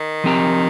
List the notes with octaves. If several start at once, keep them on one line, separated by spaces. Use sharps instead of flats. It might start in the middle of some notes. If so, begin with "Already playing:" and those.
Already playing: D#3
F3 C4 G4 A#4